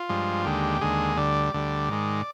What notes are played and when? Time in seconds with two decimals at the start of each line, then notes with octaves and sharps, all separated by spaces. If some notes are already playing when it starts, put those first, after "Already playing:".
Already playing: F4
0.09 G2 F3 G#3
0.45 D#2 D3 G#3 G4
0.81 D#2 D3 G#3 G#4
1.17 D2 D3 G3 D5
1.54 D2 D3 G3
1.89 G#2 D#3 G#3